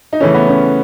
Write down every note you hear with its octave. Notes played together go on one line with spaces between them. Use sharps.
D#4
C#3 E3 A3 C#4
B3
C#4